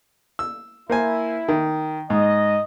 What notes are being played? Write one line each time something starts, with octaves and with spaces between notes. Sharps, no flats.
E6
A#3 E4 C5 G#5
D#3
G#2 D#5